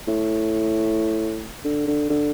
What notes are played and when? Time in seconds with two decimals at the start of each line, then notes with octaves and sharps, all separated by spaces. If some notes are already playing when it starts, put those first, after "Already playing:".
0.08 A2
1.64 D3
1.87 D3
2.10 D3